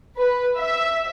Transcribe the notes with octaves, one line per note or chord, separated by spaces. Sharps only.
B4
E5